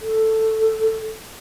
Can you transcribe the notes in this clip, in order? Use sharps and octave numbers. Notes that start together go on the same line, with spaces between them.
A4